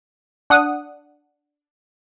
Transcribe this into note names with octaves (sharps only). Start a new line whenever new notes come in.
D4 F#5 D#6